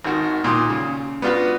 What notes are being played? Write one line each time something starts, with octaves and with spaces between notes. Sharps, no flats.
G#1 D#3 F#4
A#2 D#3 C6 D#6
C#3
B3 D4 F4 F#4 B4